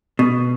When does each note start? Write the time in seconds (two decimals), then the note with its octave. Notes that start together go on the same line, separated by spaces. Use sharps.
0.19 B2